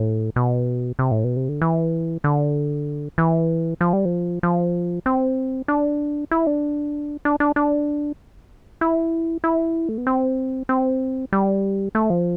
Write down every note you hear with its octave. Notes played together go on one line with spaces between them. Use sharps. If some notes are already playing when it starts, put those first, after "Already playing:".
Already playing: A2
B2
C3
A2
B2
C3
D3
E3
D3
E3
F3
G3
F3
F3
C4
D4
E4
D4
D4
D4
D4
E4
E4
A3
B3
C4
C4
G3
A3
F3